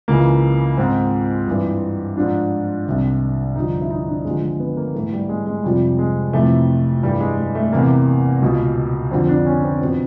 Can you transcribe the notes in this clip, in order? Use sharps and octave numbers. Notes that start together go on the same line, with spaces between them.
C#2 C#3 E3 A#3
G#2 D#3 C4
G2 E3
G#2 F3 D4
C2 C3 D#3
G2 D3 F3 D#4
E4
D#4
D4
D#2 D3 F3 G#3
G#3
B3
A#3
G#2 E3 A3
G3
G#3
G#3
F2 C3 F3 G3
G#3
F2 C3 E3 A3
G2 E3 G3
G#3
G#3
A3
E2 C3 E3 A#3
C#2 B2
F2 D3 F3 C4
D4
C#4
C4
E2 B2 C4